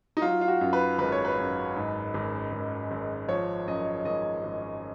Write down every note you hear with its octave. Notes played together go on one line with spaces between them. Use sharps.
D#4
F#3 F4
F4
F#4
F#2
B4
G#1 B4
C#5
B4
F#2
G#2
G#1
G#1
G#1
F3 C#5
F#2 D#5
G#1 D#5
G#1